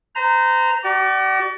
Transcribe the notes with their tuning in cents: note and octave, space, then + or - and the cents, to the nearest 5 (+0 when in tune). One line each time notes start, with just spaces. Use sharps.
C5 -35 A#5 -10
F#4 +45 D5 +15